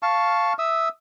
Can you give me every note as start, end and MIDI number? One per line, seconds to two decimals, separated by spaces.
0.03 0.53 77
0.03 0.53 81
0.03 0.53 85
0.59 0.89 76
0.59 0.89 87
0.59 0.89 88